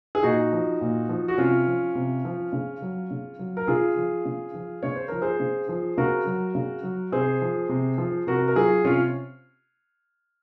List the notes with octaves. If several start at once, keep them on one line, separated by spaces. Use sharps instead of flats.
G#4
A#2 D#4 F#4
F3
A#2
F3
F#4
C3 C#4 F4
F3
C3
F3
C#3
F#3
C#3
F#3
A#4
C#3 F4 G#4
F3
C#3
F3
C#3 C#5
C5
F3 A#4
G#4 C5
C#3
F3
C#3 F#4 A#4
F#3
C#3
F#3
C3 G#4 C5
F3
C3
F3
C3 F#4 A#4
A#4
F#3 F4 G#4
C3 C#4 F4